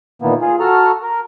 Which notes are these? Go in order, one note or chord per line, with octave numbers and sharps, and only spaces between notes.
A#2 D#3 E3 A#3 B3
F4 G#4
F#4 A4 A#5 F6
A#4